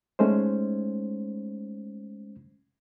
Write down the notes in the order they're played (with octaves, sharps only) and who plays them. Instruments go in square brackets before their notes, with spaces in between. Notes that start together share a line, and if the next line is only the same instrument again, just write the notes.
[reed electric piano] G#3 A3 C#4 D#4 C5